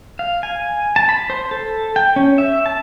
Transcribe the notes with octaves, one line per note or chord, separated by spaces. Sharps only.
F5
G#5
A5
B5
C5
A4
G5
C#4
E5
A5